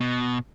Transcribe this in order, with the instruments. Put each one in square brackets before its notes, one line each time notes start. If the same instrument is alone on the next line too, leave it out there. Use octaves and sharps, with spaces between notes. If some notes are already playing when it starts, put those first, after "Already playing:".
[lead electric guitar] B2